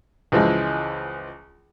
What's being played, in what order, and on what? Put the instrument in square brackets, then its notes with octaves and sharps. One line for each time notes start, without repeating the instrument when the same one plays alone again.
[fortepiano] C#2 E3 F3 G#3